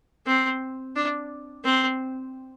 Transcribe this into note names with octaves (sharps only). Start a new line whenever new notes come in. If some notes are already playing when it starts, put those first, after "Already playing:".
C4
D4
C4